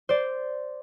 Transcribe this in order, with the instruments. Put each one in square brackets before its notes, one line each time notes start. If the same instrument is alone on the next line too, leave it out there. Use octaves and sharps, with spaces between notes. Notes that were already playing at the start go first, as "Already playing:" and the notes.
[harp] C5 D5